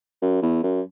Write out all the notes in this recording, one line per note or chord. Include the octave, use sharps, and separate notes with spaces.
F#2
E2
F#2